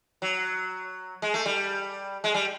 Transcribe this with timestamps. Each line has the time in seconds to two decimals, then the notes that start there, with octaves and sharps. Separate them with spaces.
0.22 F#3
1.22 G#3
1.34 A3
1.46 G3
2.24 G#3
2.34 G3